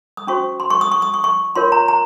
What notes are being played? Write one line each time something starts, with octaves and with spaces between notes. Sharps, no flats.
D#6
C#4 F#4 C5 C#6
C6
C#6
D#6
C#6
D#6
C#6
C#6
F4 A#4 C#5 C6
A#5
A#5